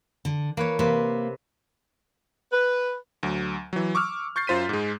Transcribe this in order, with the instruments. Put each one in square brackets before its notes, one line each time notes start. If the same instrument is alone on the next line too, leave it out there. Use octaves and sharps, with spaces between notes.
[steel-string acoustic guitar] D3
[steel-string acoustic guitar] E3 [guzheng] A#3 B4 C#5
[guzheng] C3 B4 [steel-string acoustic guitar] A#3
[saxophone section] B4
[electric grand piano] D2 F#3
E3 F#3
C#6 D6 E6 F6
C#6 G6 A6 C7
F#2 F4 C5 B6 D#7
G#2 G#3